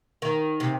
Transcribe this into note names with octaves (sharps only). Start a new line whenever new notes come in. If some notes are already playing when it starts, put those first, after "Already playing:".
D#3
C3